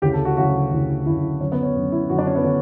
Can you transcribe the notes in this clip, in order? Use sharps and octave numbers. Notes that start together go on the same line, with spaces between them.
D2 C#3 E3 G4
A4
F#4
D2 C#3 E3 F#4
D2 C#3 E3
D2 C#3 E3 E4
F#2 D3 C#4
B3
C#4
F#2 D3
E4
F#2 D3 F#4
D4
C#4
B3
D3 C#4